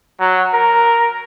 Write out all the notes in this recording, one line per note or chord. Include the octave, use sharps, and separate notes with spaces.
F#3
A#4